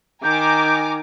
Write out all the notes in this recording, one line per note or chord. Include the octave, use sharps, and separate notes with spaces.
D#3 G#5 A#5 D6 G6